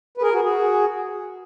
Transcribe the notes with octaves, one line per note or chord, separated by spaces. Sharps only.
B4
G#4 A#4
F#4 G#4
F#4 G#4